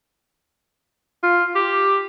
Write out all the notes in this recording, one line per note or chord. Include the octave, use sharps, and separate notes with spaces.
F4
G4